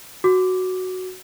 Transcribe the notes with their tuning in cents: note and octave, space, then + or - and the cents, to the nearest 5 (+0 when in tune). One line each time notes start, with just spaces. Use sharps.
F#4 +0 D6 +0